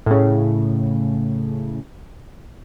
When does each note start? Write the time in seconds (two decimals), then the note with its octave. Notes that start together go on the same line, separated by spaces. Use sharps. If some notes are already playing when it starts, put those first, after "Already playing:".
0.06 A2 C#3